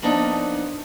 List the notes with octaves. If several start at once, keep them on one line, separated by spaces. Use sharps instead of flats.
F3 A#3 B3 D4 D#4